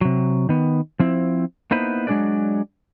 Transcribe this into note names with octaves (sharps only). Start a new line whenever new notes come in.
C3 F#3
D#3 B3
F3 C4 E4
A#3 B3 D#4 E4 B4 C5
F#3 G#3 D4 G#4 B4 D5